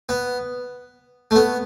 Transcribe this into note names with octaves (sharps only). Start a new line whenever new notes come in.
B3
A3
B3